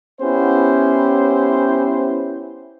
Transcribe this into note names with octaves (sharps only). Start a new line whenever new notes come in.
B3 C#4 E4 G4 C5